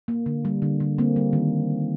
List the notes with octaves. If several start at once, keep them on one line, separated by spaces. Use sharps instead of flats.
A#3
D3
G3
D3
D3
A#3 C4
G3
D#3